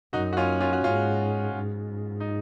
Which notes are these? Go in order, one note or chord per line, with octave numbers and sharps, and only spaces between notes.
F#2 D#4 F#4
F#4
C#4 F4
C#4 F4
F#4
G#2 C#4 F4
G#2
D#4